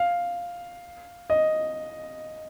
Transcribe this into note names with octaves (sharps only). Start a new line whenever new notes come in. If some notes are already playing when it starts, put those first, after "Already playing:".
Already playing: F5
D#5